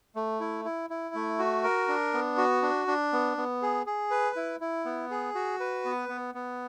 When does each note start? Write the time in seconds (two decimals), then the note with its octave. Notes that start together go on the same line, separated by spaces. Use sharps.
0.16 A3
0.40 E4
0.65 E4
0.90 E4
1.15 A3
1.39 F#4
1.64 A#4
1.88 D4
2.14 B3
2.37 F#4
2.62 D4
2.88 D4
3.13 B3
3.37 B3
3.62 G#4
3.87 G#4
4.11 B4
4.36 E4
4.61 E4
4.85 B3
5.11 G#4
5.35 F#4
5.60 B4
5.85 B3
6.09 B3
6.35 B3